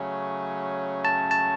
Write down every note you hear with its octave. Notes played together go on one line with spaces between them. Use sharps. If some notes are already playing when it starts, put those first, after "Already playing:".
Already playing: C#3 F#3 A3 C#4
A5
A5